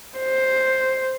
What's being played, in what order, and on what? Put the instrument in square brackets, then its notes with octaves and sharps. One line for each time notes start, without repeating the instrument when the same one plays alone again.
[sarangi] C5